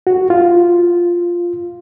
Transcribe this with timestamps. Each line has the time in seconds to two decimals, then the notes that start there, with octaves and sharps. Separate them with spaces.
0.07 F#4
0.30 F4